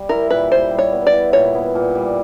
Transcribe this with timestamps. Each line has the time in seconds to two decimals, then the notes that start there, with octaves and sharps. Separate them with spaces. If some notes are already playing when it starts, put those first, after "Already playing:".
Already playing: G3
0.09 E4 A#4
0.30 A#2 B4
0.51 G3 C5
0.71 G3
0.79 C#5
0.92 B3
1.07 D5
1.13 E4
1.33 A#2 C#5
1.55 B3
1.75 A#2
1.95 G3